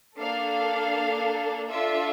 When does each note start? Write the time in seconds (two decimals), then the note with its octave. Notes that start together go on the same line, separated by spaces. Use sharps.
0.19 A#3 D4 A4 F5
1.70 D4 F4 A4 E5